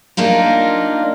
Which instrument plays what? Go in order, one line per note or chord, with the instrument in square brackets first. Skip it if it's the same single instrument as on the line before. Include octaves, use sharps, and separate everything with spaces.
[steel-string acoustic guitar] A#3 D4 D#4 F4